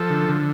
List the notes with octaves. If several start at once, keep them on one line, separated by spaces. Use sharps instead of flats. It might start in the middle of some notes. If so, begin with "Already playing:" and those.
Already playing: F3 A4
D3
D3